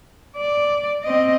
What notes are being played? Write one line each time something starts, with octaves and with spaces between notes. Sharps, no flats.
D5
C4 D#5